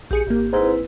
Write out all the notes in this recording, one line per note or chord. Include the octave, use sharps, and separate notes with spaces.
A#1 G4 G#4 C#7
G#1 A#3
G#2 C4 E4 B4